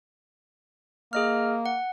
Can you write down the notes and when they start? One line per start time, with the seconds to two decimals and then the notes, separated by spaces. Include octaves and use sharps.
1.13 A#3 G#4 D#5 F6
1.66 F#5